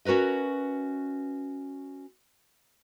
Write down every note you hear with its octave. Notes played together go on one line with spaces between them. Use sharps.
C#4 F#4 A#4 B4 D#5